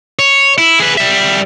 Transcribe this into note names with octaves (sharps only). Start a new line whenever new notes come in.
C#5
E4
G#4 B4
G3 E5